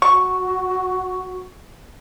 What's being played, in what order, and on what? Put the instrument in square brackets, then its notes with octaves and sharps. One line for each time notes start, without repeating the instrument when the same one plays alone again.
[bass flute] F#4 [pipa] C#6